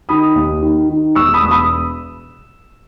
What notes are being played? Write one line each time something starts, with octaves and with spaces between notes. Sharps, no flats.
D#3 B5 D#6
D#2
D#3
D#3
E1 C#6 E6
B5 D#6
E1 E6
B5 D#6